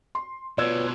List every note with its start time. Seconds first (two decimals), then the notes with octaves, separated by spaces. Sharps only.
0.15 C6
0.58 B2 F3 F4 B4 C#5 D5 E6 G#6